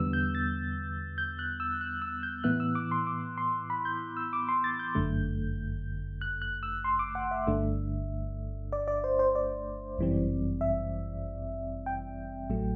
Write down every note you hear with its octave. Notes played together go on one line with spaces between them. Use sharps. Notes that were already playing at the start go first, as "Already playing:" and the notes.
Already playing: E2 D3 G3 B3 E6
G6
A6
G6
F#6
E6
F#6
E6
G6
A2 E3 B3 E4 F#6
E6
D6
C6
D6
C6
B5
G6
E6
D6
C6
A6
G6
G1 F#2 D3 A3
F#6
F#6
E6
C6
D6
F#5
E5
G1 G2 D3 A3 D4
D5
D5
C5
C5
D5
G1 F#2 E3 G3 C4
E5
G5
A1 A2 F#3 A3